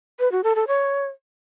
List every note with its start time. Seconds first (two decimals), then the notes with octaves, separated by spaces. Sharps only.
0.20 B4
0.32 F#4
0.44 A4
0.55 A4
0.67 C#5